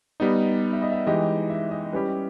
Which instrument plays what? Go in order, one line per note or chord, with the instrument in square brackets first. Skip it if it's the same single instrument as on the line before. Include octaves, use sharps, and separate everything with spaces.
[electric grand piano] G3 B3 D#4 [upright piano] D#5
[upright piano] E5
D#5
E5
[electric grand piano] E3 G#3 D#4 G4 [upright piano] D#5
[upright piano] E5
D#5
[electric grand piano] G3 C#4 E4 G4 [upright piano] B4